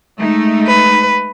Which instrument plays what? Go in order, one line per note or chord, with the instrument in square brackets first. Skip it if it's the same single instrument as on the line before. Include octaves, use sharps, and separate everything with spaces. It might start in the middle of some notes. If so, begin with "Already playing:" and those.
[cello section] G#3 A3 D#4
[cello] B4